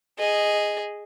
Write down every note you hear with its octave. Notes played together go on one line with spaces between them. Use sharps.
G#4 D#5